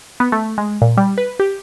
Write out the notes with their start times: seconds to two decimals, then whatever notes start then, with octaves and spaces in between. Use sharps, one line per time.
0.20 B3
0.32 A3
0.58 G#3
0.82 A#2
0.97 G3
1.18 B4
1.40 G4